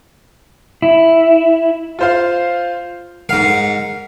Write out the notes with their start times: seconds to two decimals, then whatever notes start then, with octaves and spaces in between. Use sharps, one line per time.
0.82 E4
1.99 F4 C5 F5
3.29 G#2 A#4 F5 F#5 C7